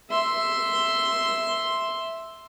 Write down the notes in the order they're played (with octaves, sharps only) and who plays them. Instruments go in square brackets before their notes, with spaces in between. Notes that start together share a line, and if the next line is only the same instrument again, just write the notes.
[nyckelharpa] E5 C6